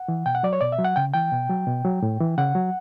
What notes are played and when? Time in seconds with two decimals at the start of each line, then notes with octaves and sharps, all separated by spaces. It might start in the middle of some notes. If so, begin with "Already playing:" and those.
Already playing: F#5
0.08 E3
0.26 B2 G5
0.35 F#5
0.43 F#3 D5
0.53 C#5
0.61 B2 D5
0.72 E5
0.79 F#3
0.85 F#5
0.96 C#3 G5
1.14 E3 G5
1.32 B2
1.50 F#3
1.67 B2
1.85 F#3
2.02 A2
2.20 E3
2.38 C#3 F#5
2.55 F#3